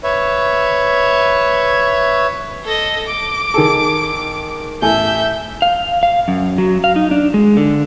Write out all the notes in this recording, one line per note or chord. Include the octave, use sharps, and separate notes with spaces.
B4 C#5 E5
A4 D#5
D6
D#3 G#4 A4
A1 A4 E5 G#5 G6
F5
F5
F#2
F#3
F5
D#4
D4
G#3
D3